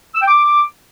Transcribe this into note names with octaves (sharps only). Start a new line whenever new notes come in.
E6
G5
D6